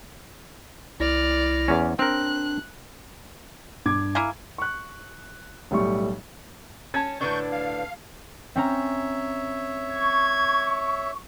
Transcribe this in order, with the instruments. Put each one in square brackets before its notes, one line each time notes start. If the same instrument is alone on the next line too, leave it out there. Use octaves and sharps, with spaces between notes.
[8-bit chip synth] C2 E4 A#6 [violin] D5 F6
[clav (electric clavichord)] E2 C#4
[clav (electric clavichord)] C4 A#4 [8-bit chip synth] D4 [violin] F#6
[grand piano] G2 D6 G#6
[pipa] A#3 E4 G#5
[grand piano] C#6 F#6
B1 A2 G3 A3 C#6
[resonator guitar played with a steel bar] C#4 [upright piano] A5 G#6
[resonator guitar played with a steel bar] A2 D3 D4 [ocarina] B4 [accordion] C#6 G6
[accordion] F5
[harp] C4 C#4 A#5 [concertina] C#5 E5
[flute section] C#6 [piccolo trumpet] G#6